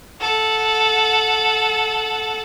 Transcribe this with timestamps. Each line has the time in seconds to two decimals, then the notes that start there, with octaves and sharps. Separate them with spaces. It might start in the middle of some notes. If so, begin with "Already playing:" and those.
0.20 A4 F#5